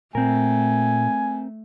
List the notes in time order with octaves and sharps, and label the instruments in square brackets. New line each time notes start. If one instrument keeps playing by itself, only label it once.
[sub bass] A#2 [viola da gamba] A3 [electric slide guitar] C4 A#4 [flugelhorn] G#5